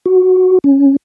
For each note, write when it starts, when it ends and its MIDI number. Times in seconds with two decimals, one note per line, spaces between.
0.06 0.58 66
0.64 0.96 61